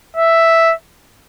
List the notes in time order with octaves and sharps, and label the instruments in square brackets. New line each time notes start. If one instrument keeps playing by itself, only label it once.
[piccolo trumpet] E5